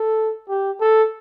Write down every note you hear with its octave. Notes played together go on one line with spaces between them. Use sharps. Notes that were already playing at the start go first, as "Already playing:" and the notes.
Already playing: A4
G4
A4